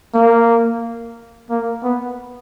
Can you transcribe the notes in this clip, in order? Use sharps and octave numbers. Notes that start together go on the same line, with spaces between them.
A#3
A#3
B3